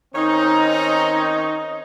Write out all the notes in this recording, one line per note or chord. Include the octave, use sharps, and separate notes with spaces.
D#3 C4 C#4 D#4